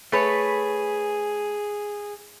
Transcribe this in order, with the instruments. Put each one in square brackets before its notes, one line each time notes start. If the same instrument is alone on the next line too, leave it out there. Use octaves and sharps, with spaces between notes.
[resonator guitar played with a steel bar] A3 B4 C#5 [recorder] G#4